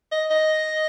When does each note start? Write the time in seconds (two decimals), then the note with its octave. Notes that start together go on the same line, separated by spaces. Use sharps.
0.11 D#5
0.30 D#5